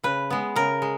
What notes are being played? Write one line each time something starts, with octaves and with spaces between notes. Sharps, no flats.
C#3 B4
G#3 B3
C#3 A#4
G#3